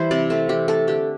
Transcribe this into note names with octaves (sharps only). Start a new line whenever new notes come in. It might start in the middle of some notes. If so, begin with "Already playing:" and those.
Already playing: E3 G3 E4 C5
C3 D5
A3 C4 A4
E3 G4
A3 C4 A4
D3 G4